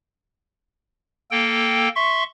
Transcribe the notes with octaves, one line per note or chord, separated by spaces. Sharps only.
A#3 A4 G5
E5 C6 C#6